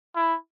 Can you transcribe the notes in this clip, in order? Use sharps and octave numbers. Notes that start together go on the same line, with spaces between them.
E4